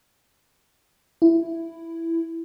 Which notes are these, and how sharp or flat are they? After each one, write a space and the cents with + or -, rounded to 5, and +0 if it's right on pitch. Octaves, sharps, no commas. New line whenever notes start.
E4 +10